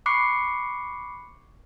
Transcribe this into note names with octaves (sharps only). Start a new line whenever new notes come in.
B5 C#6 D6 F#6 C7 C#7